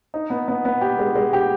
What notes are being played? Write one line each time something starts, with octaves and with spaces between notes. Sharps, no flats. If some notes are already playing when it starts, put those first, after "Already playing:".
D#4
B3
B3
B3
G4
G#3
G#3
G4